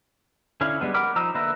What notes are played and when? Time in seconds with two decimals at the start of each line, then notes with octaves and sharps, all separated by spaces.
0.61 D3 C#4 E4 F5
0.80 G3 G#3 B3 D4
0.94 A#4 F#5 B5 D6 F6
1.16 F3 D#4 A#5 E6
1.35 D3 A#3 B4 E5 A#5